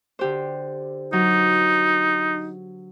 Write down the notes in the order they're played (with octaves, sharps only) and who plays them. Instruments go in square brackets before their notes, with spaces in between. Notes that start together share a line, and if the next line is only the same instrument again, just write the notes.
[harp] D3 G4 C5
[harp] F#3 [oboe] D#4